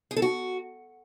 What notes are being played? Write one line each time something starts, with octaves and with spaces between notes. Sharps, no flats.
G#4
A4
F#4